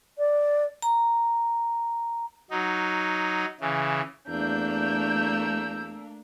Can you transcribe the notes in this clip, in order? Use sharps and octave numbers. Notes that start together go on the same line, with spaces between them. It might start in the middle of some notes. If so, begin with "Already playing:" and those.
D5
A#5
F#3 D#4
C#3 E3
E2 A3 A#3 D4 E6 G6